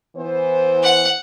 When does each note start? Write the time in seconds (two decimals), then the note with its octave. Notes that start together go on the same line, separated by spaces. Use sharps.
0.16 E3 B3 C5
0.83 F#5